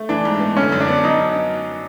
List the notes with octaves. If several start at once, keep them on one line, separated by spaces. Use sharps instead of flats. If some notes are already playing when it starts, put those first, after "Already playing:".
Already playing: A3
E3 D4
G#2
B3
D3 C#4
F#2
D4
B3
F#3 D#4